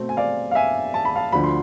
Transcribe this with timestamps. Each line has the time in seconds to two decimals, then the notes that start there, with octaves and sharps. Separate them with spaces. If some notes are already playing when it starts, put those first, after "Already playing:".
Already playing: B2 A3 C4
0.09 G#5
0.17 D5 F5
0.51 F5
0.55 E5 G#5
0.94 A5
1.05 B5
1.16 F5 A5
1.32 D2 D3 F3 B5
1.44 C6